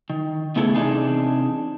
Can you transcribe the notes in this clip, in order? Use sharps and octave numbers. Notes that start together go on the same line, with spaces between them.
D#3
C#3 A3 B3 E4 G#4 A4
C3 E3 D4 D#4 G#4